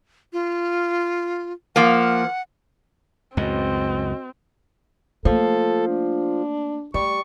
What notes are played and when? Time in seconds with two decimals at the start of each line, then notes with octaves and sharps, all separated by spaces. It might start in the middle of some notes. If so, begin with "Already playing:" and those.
0.33 F4
1.76 F3 A#3 F#5
3.37 C#2 F#2 A2 C4 F#4 D#5
5.25 F3 A3 A#3 A4
5.88 D4
6.94 G3 A3 C#6